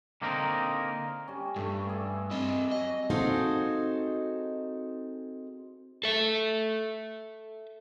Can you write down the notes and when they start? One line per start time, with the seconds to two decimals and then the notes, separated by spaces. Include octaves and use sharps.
0.22 D3 A#3 C4 D#4 A#4
1.28 G3 C#4
1.56 G2 A3
1.89 G#4 D5 E5
2.31 C4 D#5
2.72 F#3 D#5
3.10 C4 D#4 F#4 G#4 A4 F5
6.03 A4 E5